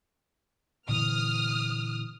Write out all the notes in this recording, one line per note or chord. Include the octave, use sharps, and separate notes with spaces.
A#2 D3 E3 D#6 F6